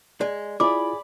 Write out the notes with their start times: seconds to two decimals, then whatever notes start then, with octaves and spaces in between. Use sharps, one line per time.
0.21 G#3 D5
0.60 E4 F4 G#4 D5 B5 D6